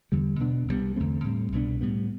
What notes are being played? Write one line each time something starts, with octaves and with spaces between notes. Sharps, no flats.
E2 D3 G3 B3
B2 B3 D4
C2 B2 G3 B3
E2 D3 A3 C4
A2 G3 C4
C2 B2 B3 D4
A2 G3 B3